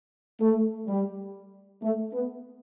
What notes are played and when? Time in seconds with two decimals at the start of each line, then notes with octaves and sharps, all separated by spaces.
0.40 A3
0.87 G3
1.82 A3
2.13 B3